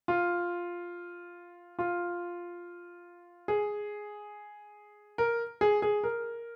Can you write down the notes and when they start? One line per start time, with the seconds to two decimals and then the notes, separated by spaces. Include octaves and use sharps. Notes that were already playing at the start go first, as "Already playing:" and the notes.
0.08 F4
1.79 F4
3.48 G#4
5.18 A#4
5.61 G#4
5.82 G#4
6.04 A#4